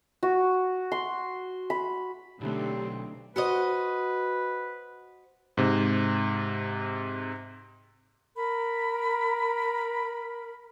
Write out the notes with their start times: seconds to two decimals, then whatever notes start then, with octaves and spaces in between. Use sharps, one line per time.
0.23 F#4
0.92 C6
1.70 B5
2.41 B1 D3 A3 C4 D#4 E4 G4
3.36 F#4 B4 C5 D#5
5.57 G#2 C3
8.36 A#4 B5